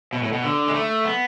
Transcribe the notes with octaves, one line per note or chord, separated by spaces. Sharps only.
B2
A2
B2
D3
G#3
A3
B3